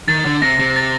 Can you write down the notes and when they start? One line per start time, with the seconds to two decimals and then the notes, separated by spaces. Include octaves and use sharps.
0.08 D#3 A6
0.25 D3
0.42 C3 A#6
0.59 C3
0.76 A6